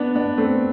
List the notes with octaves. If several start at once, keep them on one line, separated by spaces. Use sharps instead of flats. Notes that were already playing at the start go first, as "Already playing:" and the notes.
Already playing: B3 D4
B3 D4
A3 C4